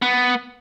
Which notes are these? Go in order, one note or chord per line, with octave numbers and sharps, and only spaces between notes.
B3